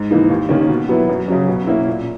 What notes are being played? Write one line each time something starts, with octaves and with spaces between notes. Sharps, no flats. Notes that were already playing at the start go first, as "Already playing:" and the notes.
Already playing: G#2
E3 A#3 D#4
D#2
D#3 A#3 C#4
B2
F#3 B3 E4
F#2
C#3 F#3 C#4
B2
A#3 C#4 E4
A#2